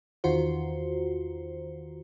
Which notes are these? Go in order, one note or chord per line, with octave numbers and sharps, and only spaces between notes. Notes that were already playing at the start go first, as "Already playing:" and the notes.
E2 D#3 F4 F#4 C5